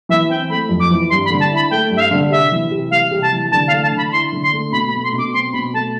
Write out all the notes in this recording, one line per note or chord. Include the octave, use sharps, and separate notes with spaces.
E3 E5
C4 G5
A3 B5
F2
D6
E3
G2 C6
B5
D3
A5
E4 B5
A3 G5
G2
E5
F5
D3
C3 E5
E3
C3
G3 F5
C3
A5
E3
D3 A5
F5
A3
A5
D3
B5
E4 C6
D3
C6
A3
B2 B5
B5
A3
C6
B2
D6
C4 C6
B2 B5
A3 A5